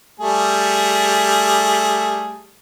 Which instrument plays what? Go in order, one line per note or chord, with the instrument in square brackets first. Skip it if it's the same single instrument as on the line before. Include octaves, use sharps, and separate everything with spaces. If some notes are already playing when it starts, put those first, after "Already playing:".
[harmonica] G3 A3 G#4